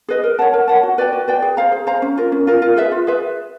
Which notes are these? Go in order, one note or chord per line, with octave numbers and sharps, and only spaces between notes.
G#4 B4 D#5
A#4
C#5 F#5 A5
A#4
C#5 F#5 A5
F#4
B4 D5 G5
F#4
B4 D5 G5
G#4
C5 F5 A#5
G#4
C5 F5 A#5
C#4
F4 A#4
C#4
F4 A#4
F4
G#4 B4 E5
F4
G#4 B4 E5